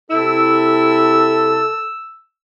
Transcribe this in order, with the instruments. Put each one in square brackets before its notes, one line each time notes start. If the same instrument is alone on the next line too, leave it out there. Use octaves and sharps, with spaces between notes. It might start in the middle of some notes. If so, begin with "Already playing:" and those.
[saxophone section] C3 E4 [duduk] A4 [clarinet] E6